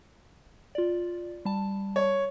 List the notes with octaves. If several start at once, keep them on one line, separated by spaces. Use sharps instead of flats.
F4 D5
G3 A5
C#5